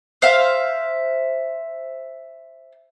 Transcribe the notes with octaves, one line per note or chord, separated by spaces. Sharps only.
C5 E5 F5